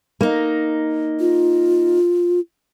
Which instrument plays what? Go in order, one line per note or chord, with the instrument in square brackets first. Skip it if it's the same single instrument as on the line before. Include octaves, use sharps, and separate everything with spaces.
[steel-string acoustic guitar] A#3 D#4
[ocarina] F4